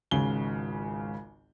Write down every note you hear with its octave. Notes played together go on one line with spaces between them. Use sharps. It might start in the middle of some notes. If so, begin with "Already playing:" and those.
G#1 C#2 C#3 G7